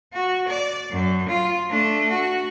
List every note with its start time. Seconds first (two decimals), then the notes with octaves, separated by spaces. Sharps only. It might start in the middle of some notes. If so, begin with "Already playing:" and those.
0.13 F#4
0.48 D5
0.90 F#2
1.29 F4
1.70 A3 D4
2.10 F#4